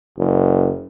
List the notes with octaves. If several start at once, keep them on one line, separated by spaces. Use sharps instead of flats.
F#1